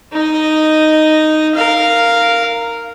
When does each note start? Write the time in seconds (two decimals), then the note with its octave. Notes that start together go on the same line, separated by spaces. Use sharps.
0.13 D#4 D#5
1.54 A#4 F5